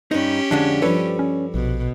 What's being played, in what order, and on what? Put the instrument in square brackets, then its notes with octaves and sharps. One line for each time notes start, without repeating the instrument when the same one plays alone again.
[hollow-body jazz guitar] G2 D#4 [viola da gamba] C#4 G4 [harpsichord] D#5
[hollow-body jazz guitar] F2 D3 G#3 [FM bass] D4
[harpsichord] G2 F3 G3 [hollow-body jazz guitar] A4 B4 C#5
[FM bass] C#4
[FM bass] A#1 [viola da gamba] B2